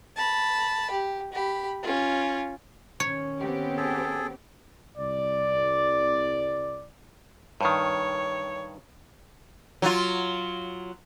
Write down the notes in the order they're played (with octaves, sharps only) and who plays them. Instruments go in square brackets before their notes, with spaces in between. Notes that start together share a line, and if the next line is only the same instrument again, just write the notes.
[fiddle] A5 B5
G4
G4 B5
C#4 F4
[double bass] D#3 C#4 [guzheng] C#5
[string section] B3 C4 G4
[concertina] G#4 A4
[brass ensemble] C2 D5
[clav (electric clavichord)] G2 D#3 [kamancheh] C#5
[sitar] F#3 F4